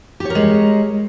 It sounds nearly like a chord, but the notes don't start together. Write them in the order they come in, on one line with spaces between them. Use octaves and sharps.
G4 C#5 A#4 G#3